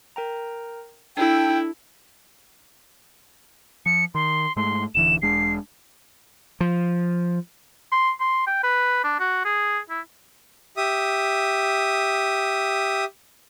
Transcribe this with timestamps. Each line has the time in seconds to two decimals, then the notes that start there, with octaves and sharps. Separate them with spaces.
0.16 A#4 G5 A#5
1.17 D4 E4 A4 G5
3.86 F3 C#7
4.15 D#3 C6
4.56 G#2 G#3 A3 C6
4.95 D1 D3 E3 E7
5.22 E1 G#3 D4 C7
6.60 F3
7.92 C6
8.20 C6
8.47 G5
8.63 B4
9.04 D4
9.20 F#4
9.45 G#4
9.89 E4
10.77 G4 E5 D#6